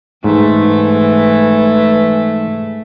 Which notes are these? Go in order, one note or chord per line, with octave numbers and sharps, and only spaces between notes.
G#2 E3 A3